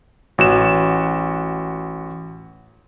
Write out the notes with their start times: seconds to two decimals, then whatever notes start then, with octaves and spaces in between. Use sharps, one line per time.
0.38 A1 F#4 E7